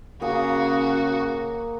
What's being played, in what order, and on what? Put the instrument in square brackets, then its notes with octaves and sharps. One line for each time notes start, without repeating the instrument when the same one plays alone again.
[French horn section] C#3 [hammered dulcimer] A#3 G#4 [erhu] F#4